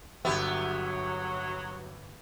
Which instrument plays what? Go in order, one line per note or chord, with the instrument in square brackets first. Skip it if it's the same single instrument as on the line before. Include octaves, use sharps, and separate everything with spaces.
[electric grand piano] G1 G4 E5 [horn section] F#3 [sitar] B3